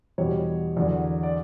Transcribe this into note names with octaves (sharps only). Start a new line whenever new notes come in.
E2 B2 G3 C#5
E2 D3 F#3 D5
D5